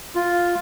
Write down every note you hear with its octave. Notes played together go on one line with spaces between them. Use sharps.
F4